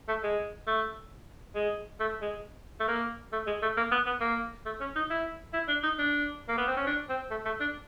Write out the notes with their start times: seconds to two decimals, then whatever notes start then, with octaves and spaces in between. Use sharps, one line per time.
0.08 A3
0.23 G#3
0.67 A3
1.55 G#3
2.00 A3
2.22 G#3
2.80 A3
2.88 A#3
3.33 A3
3.47 G#3
3.62 A3
3.77 A#3
3.91 B3
4.06 B3
4.21 A#3
4.65 A3
4.80 C#4
4.95 D#4
5.10 E4
5.53 E4
5.68 D4
5.83 D#4
5.98 D4
6.49 A#3
6.58 B3
6.68 C4
6.77 C#4
6.87 D4
7.09 C4
7.31 A3
7.45 A3
7.60 D4